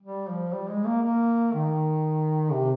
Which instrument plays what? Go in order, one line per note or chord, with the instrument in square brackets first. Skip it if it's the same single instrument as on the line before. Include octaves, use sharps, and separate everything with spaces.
[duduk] G3
F3
G3
G#3
A#3
A#3
D#3
C3